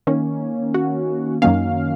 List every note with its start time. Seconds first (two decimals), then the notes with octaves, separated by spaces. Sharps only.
0.07 D#3 A#3 C#4
0.74 F#4
1.42 F#2 D#3 F#3 A#3 C#4 F5